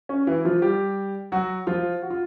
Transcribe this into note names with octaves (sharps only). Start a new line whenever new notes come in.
C#4
E3 E4
F3 F4
G3 G4
F#3 F#4
F3 F4
F#4
F4